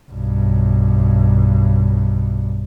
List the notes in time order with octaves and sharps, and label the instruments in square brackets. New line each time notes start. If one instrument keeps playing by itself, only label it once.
[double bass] B1 G2